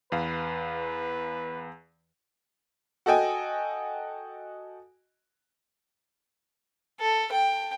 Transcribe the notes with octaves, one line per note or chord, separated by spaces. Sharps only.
E2 B4 F5
F#4 A4 D#5 G5 G#5
A4
G5